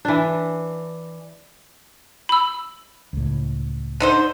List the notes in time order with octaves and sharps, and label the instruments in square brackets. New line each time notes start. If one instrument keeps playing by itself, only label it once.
[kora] E3 D4
[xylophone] B5 E6
[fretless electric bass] C#2 A2
[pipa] D3 D#4 C5